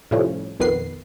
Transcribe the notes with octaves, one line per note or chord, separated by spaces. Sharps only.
A2 C3 F3 G3 A3 C#4
B1 F2 D#3 B3 B4 C7